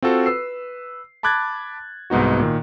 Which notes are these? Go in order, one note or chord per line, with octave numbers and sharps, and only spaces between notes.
C4 F4 F#4 A4
B4 E6 C7
A5 B5 D6 F#6 G#6 A6
C2 G#2 B3 D#4 F#4
A#2 D#3